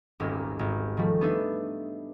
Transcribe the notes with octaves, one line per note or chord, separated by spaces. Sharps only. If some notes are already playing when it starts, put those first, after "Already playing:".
D#1 G#1 D#2
G#1
D#3 F3 G3 A3
B3 D4 D#4 B4 E5